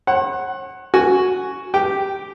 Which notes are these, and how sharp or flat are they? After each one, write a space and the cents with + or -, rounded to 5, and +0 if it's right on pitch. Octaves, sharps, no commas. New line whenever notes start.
C#5 -45 F#5 +5
F#4 +5 G#5 +0
G4 +0 G5 -15